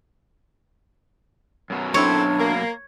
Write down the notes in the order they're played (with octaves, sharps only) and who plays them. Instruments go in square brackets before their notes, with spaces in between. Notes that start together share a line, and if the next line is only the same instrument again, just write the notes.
[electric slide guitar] F#2 B2 F#3
[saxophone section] C4 E4 A4 [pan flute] D4 [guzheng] C#5
[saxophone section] A#3